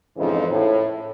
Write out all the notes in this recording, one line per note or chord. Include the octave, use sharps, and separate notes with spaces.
F2 G#2 C#3 E3 D#4
A2